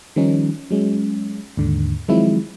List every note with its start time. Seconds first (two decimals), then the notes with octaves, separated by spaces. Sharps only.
0.16 D#3 F3 G3 C#4 D#4
0.70 F#3 G#3 C#4
1.57 D#2 G#2 D3
2.08 D#3 F3 F#3 G#3 C4 E4